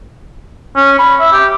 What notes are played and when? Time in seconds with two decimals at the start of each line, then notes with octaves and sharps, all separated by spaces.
0.76 C#4
0.99 B5
1.20 E5
1.32 G4